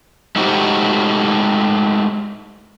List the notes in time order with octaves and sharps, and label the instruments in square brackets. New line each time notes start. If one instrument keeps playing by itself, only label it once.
[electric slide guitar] G#3 A3 D#4 F#4 G4 C5